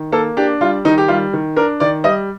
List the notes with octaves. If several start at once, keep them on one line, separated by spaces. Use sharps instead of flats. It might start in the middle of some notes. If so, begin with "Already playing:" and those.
Already playing: D#3
A#3 A4
D4 G4
G3 F4
D#3 D#4
G4
G3 F4
D#3
D4 A#4
D#3 D5
G3 D#5